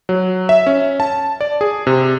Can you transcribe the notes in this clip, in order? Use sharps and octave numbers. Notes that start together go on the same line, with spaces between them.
F#3
E5
C#4
A5
D5
G#4
C3